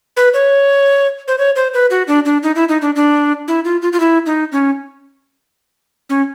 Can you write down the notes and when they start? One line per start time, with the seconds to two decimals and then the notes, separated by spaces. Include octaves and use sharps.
0.17 B4
0.34 C#5
1.28 C5
1.38 C#5
1.56 C5
1.74 B4
1.91 F#4
2.08 D4
2.25 D4
2.43 D#4
2.56 E4
2.69 D#4
2.82 D4
2.96 D4
3.48 E4
3.65 F4
3.82 F4
3.93 F4
4.00 E4
4.26 D#4
4.52 C#4
6.10 C#4